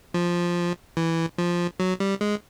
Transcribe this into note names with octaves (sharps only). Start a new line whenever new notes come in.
F3
E3
F3
F#3
G3
G#3